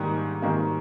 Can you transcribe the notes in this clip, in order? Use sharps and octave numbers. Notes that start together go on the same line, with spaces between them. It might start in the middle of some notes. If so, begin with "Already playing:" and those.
Already playing: G#2 D#3 G3 A#3
G#2 D#3 G3 A#3